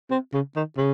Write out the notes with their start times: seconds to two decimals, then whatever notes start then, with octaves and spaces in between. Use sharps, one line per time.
0.11 C4
0.34 C#3
0.56 D#3
0.78 C#3